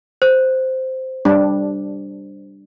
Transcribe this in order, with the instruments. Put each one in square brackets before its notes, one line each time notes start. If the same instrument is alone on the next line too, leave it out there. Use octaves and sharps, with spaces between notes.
[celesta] C5
[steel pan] G3 D4